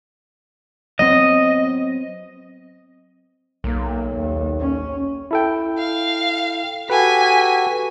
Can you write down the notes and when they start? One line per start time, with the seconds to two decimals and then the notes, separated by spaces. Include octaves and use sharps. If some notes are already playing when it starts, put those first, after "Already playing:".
0.99 F#3 B3 C4 D#5
3.64 B1 A#3
4.16 D#2
4.59 C#4
5.31 E4 A4 G5
5.78 F5
6.90 F#4 G4 A4 B4 G#5 B6